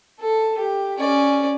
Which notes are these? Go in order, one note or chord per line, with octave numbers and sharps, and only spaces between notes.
A4
G4
C#4 D5